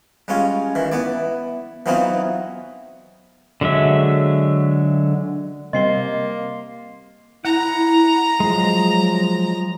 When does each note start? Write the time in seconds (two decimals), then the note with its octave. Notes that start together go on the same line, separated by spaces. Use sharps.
0.28 G3 G#3 C#4 F4 G#5
0.75 D#3 E3
0.92 B3 E4 D5
1.86 E3 F#3 B3 C4 D#4 F4
3.61 D3 F#3 G#3 E5
5.73 C3 G3 A#3 C4 D#5 C6 C7 G7
7.45 E4 F#5 A#5
8.40 F3 F#3 G#3